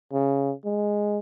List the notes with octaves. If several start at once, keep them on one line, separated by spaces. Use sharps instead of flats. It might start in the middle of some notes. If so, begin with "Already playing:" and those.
C#3
G#3